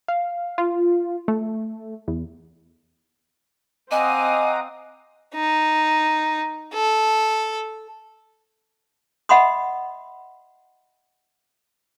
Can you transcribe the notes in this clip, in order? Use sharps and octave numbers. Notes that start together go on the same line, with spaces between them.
F5
F4
A3
E2
C4 D#5 F5 F#5 G#5 A#5 D6 D#6
D#4
A4
D#5 E5 F#5 B5 C6 D#6